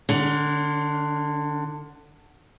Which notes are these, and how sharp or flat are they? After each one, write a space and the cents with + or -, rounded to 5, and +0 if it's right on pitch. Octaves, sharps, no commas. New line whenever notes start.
D3 +20 D4 -45